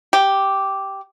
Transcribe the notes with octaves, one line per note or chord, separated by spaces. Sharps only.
G4